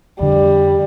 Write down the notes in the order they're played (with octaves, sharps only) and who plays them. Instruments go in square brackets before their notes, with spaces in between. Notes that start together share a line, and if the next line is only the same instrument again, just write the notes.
[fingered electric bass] F2 D3 [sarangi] G3